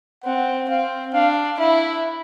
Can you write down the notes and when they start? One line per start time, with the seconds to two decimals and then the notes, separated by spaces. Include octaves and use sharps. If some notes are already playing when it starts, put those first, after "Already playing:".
0.24 C4 F#5
0.69 C4 F5
1.13 D4 F5
1.59 E4 E5